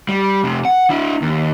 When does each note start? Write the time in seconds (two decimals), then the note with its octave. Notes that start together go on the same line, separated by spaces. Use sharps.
0.09 G3
0.44 F2 C3
0.65 F#5
0.90 D4 E4
1.22 D#2